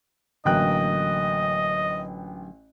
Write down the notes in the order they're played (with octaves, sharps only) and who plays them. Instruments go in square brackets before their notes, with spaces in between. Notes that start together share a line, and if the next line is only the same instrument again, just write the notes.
[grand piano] A1 G5 F#6 [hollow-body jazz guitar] D3 F#3 A#3 [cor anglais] D#5